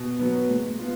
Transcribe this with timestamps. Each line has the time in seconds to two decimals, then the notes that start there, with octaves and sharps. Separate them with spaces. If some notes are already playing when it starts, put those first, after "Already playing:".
Already playing: B2
0.19 F#3 B3
0.49 G#3
0.79 B3 F4